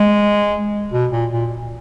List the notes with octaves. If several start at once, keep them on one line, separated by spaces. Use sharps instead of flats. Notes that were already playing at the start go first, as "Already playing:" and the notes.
Already playing: G#3
B2
A#2
A#2